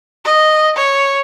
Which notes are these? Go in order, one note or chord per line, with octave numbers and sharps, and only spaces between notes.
D#5
C#5